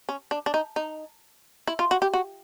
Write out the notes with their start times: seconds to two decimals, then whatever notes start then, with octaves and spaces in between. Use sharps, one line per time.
0.09 C#4
0.31 D4
0.46 D4
0.54 D#4
0.76 D#4
1.67 E4
1.79 F4
1.91 F#4
2.02 G4
2.14 F#4